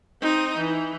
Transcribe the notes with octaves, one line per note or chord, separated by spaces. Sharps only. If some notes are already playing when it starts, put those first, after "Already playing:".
C4 D#4
E3